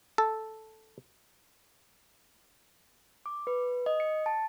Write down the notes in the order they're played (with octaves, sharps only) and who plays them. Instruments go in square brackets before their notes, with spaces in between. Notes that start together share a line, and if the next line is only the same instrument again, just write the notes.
[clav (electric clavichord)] A4
[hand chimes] D6
B4
D#5
C#7
A5